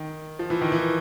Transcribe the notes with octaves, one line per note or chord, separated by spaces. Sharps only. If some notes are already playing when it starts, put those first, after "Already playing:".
Already playing: D#3
F3
E3
D#3
E3